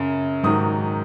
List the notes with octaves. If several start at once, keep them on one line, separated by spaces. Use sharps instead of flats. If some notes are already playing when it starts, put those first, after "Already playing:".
Already playing: F#2 C#3
G#2 D#3 F#3 D#6